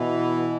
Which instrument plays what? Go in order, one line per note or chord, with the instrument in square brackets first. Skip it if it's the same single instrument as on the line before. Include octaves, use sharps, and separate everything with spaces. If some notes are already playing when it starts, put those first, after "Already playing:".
Already playing: [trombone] B2 [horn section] E3